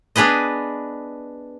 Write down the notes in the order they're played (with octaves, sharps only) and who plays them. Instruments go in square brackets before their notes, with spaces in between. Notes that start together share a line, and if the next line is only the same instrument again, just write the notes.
[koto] B3 D4 G#4 B4 D#5